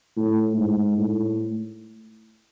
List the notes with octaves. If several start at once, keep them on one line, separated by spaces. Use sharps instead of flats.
A2
G#2
A2